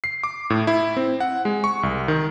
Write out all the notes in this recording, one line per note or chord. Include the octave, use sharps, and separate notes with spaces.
C7
D6
A2
E4
C4
F#5
G#3
C#6
C2
D#3